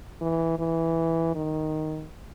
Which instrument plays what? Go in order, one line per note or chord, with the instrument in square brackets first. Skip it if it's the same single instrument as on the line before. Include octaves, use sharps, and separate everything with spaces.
[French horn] E3
E3
D#3